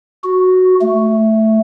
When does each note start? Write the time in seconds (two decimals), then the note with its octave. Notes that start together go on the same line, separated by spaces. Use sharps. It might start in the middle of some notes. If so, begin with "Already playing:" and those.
0.24 F#4
0.81 A3